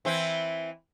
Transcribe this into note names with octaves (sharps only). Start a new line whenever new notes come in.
E3 C4 E4